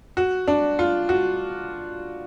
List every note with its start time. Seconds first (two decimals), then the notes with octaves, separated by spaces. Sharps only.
0.17 F#4
0.48 D4
0.79 F4
1.09 F#4